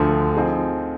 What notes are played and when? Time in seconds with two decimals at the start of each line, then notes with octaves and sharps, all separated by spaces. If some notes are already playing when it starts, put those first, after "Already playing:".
Already playing: D2 D3 F3
0.35 F3 C4 D#4 G#4